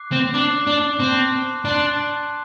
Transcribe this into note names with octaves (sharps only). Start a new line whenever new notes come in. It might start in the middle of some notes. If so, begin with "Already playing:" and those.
Already playing: D6 F#6 C7
C4
D4 D6 F#6 C7
D4
C4 A5 C6 F#6 C7
D4 A5 C6 F#6 C7